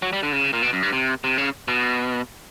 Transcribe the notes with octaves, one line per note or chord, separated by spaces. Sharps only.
F#3
G3
D3
C#3
A#2
B2
F#2
G2
C3
C3
C#3
B2